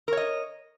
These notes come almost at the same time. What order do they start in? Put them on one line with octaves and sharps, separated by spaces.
A#4 C#5 D#5